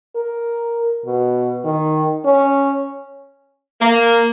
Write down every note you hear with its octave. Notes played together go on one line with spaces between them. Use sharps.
A#4
B2
D#3
C#4
A#3